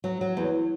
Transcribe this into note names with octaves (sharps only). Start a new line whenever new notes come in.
F#3
F#3
E2